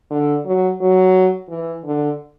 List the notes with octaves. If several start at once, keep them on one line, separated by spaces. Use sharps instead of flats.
D3
F#3
F#3
E3
D3